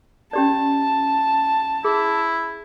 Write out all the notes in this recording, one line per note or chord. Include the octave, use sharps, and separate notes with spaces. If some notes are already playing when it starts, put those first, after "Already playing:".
C#4 G4 D5 A5
E4 G#4